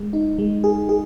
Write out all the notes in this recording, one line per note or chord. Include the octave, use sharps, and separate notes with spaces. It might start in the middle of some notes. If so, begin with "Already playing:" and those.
Already playing: G#3
D#4
G#3
G#4
G#4